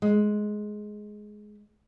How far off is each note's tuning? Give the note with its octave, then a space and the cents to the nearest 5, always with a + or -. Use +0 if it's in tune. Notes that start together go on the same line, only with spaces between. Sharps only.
G#3 +10